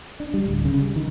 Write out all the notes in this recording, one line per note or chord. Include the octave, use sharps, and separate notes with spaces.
D4
G3
D1
C#3
G3
D#3